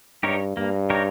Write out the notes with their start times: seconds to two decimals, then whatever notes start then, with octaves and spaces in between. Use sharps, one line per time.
0.23 G2 D#4 G4 A#4 C#5
0.57 G2 A#3
0.90 D#4 G4 A#4 C#5